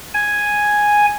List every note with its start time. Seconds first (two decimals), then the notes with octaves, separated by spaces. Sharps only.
0.14 G#5